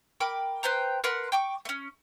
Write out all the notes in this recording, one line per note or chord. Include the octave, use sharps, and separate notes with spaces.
A#4 G5 B5 D6
B4 C5 G5 A#5
A#4 B4 F#5 C6
G5 C#6 D6
A3 C#4